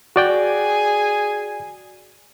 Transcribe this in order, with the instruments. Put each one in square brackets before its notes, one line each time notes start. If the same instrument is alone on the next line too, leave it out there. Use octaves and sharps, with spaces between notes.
[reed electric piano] F#4 D5 G5 [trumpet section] G#4 G#5